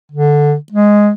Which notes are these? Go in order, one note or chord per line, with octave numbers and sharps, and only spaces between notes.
D3
G#3